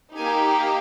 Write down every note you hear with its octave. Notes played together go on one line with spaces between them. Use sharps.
A#3 D#4 G4 G#5